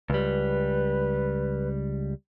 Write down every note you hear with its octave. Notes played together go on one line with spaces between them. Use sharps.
C#2 G3 B4